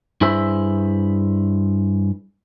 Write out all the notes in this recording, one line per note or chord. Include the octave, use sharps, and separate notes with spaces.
G2 E4 G#4 C5 E5